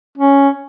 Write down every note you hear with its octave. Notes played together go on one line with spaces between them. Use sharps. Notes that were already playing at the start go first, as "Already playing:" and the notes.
C#4